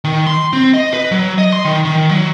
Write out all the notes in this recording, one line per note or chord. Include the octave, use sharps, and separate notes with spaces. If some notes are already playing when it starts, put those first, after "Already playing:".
D#3
C6
C4
D#5
B4
F#3
D#5
C6
D#3
D#3
F#3